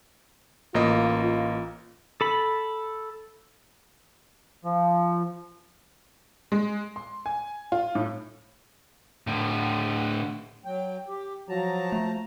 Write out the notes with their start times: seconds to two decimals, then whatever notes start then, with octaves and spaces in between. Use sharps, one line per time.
0.75 A1 A#3 F4 D#5
1.24 F4
2.21 A4 B5
4.64 F3
6.52 G#3
6.96 C6
7.26 G#5
7.72 F4
7.95 A2
9.27 A2 D3
10.65 F#3 G5
11.08 G4
11.49 F3 F#3 A5 A#5
11.92 A3